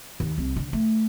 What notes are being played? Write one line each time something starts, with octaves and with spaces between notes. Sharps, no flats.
D#2
C2
D3
A3